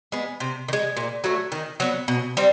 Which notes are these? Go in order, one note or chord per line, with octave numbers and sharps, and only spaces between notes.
G#3 B3
C3
D#3
G#3
A#2
F#3 A3
D#3
F#3 B3
B2
G3 C4